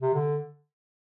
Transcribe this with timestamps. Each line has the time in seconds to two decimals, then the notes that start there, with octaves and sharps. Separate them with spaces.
0.02 C3
0.14 D3